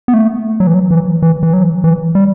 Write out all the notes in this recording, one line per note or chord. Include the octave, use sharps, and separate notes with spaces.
B3
A3
F#3
E3
F#3
E3
E3
E3
F#3
E3
G3